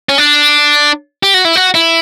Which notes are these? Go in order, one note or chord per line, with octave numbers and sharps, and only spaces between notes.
C#4
D4
G4
F#4
E4
F#4
E4